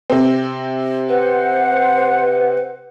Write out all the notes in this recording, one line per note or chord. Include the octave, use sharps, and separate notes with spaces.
C3 C4
B4 C5 F#5